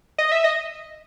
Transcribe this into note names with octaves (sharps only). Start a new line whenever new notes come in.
D#5
E5
D#5